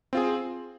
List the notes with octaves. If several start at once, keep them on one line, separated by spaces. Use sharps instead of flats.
C4 F4 G#4